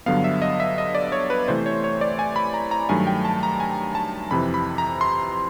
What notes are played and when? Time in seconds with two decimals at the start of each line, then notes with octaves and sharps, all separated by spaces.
0.06 G2 D3 F#3 B3 F5
0.24 E5
0.42 D#5
0.60 E5
0.78 D#5
0.95 D5
1.12 C#5
1.30 B4
1.48 C3 E3 A3 C5
1.66 C#5
1.84 C#5
2.01 D5
2.19 G#5
2.36 B5
2.54 A#5
2.71 A#5
2.89 G2 D#3 F#3 A3 G#5
3.07 G5
3.25 A5
3.43 A#5
3.60 G#5
3.95 A5
4.31 F2 C3 E3 B5
4.54 B5
4.78 A#5
5.01 C6